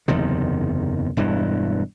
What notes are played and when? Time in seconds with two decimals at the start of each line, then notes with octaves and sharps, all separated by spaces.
0.08 F#1 E2 C3 D#3
1.17 E1 G2 E3